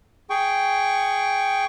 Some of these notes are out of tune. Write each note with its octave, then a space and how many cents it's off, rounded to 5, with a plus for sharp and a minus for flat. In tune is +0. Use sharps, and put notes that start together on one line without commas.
G#4 +0 G5 +0 C#6 +15